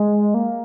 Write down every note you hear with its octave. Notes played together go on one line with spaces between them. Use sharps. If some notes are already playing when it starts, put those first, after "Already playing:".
Already playing: G#3
A#3